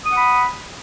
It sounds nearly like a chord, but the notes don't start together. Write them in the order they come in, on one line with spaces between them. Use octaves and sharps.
D#6 F#5 B5